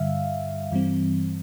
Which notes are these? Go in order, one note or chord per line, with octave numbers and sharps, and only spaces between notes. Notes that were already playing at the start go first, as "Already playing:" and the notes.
Already playing: G2 D3 G3 E5 F5
G2 E3 G3 C4